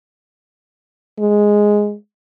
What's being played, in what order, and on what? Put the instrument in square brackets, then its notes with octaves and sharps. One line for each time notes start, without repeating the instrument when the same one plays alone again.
[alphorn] G#3